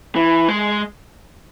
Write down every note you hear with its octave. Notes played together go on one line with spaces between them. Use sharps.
E3
G#3